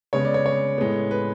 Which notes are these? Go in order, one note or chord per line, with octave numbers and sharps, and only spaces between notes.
C#3 G#3 B3 C#5
D5
C#5
C#5
A2 G#3 B3
B4